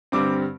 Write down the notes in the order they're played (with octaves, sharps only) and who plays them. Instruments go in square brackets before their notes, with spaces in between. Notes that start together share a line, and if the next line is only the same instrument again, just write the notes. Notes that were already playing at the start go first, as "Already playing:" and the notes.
[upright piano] G2 D3 G3 C4 D6